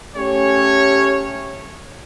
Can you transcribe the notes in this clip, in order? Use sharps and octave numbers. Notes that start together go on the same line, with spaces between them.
A3 C#4 G4 C#5